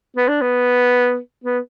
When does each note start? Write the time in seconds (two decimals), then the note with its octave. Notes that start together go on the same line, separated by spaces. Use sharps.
0.17 B3
0.28 D4
0.41 B3
1.44 B3